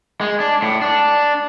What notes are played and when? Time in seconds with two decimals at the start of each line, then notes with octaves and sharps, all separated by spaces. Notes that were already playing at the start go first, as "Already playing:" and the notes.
0.21 G#3
0.40 D4
0.62 A2
0.82 D4